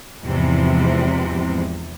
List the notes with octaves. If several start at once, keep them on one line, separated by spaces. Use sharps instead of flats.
E2 G#2 C3 E3 F3